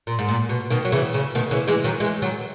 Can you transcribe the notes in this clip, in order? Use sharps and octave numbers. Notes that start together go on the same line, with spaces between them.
A#2
G#2
A#2
B2
B2 D#3
F#3
C#3 E3
C#3
B2 D#3
C#3 E3
E3 G#3
D#3 F#3
E3 G#3
D#3 F#3